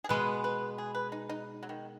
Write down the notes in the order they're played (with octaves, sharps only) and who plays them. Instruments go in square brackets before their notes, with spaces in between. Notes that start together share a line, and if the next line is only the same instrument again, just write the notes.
[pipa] G#4
[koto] B2 G#3 B3 [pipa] B4
[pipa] B4
G#4
B4
D#4
D#4
F#3
D#3